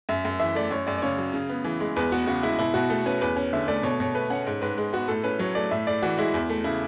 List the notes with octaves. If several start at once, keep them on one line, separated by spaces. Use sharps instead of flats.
F#2 E5
F#2
E3 E5
A3 D5
F#2 C#5
F#2 D5
D5
C#3 C#5
F#3
C#3
B3
E3
G#3
E2 B4
B3 F#4
C#3 F#4
G#3 E4
B2 E4
B2 F#4
A3 A4
C#4 B4
E2 B4
C#4
D3 E5
A3 D5
B2 C#5
B2 C#5
A3 B4
C#4 F#5
G#2
G#2 B4
G#3
B3 F#4
A2 A4
C#4 B4
F#3 C#5
A3 D5
A2 E5
A2 D5
E3 F#4
G#3 E4
E2
A3
C#3 E4